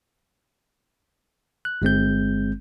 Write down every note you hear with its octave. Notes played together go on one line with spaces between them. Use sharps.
F#6
G1 G#3 C4 G6